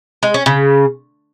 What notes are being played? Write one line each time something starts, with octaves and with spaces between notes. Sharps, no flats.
G#3
C#4
C#3